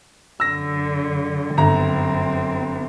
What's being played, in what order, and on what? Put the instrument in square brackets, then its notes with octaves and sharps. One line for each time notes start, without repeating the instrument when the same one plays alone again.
[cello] F#2 D3 [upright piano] E6 A#6
[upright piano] G1 A#5 [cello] F#2 C4